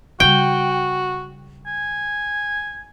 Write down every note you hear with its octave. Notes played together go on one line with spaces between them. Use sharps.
C#3 G3 F#4 G5
G#5